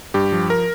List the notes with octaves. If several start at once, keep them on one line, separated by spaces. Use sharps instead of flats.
G2 G4
F3
A#4